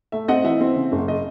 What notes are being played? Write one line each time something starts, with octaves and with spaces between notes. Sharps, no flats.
A3 E5
C4 D#5 F#5
E3 E5
C4
C#3
F#1
D#5